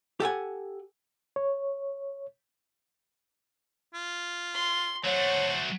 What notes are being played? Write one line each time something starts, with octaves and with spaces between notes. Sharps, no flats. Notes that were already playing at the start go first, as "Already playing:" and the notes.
G4 A4 F#5 G#5
C#5
F4
C6
F#3 A3 C5 C#5 F#5